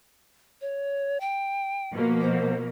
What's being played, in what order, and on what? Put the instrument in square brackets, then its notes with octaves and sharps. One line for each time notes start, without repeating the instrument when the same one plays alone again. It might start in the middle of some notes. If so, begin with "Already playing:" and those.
[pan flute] C#5
G5
[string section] B2 F3 A#3
[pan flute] C5